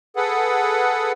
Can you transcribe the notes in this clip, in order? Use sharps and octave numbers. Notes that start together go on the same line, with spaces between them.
G#4 A4 B4 F#5